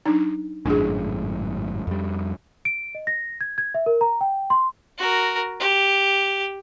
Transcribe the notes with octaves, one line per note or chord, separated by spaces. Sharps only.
F#3 D4 D#4
G#1 F#2 A2 D4 F4 G#4
F2 G3
D7
D#5
A#6
G#6
G#6
E5
A#4
A#5
G5
C6
F#4 A#4
G4